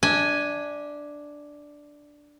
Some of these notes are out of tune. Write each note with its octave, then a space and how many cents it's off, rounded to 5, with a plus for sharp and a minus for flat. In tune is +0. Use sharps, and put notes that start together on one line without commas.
D4 +0 E5 -35 G#5 +0